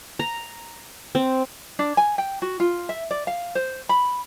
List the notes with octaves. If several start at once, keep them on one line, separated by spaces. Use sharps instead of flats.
A#5
C4
D4
G#5
G5
F#4
F4
E5
D5
F5
C5
B5